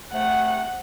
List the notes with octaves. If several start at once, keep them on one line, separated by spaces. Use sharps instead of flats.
C3 A3 F#5